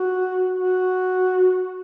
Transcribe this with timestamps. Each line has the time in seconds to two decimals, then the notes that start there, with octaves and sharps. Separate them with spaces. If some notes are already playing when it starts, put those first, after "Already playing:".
Already playing: F#4
0.59 F#4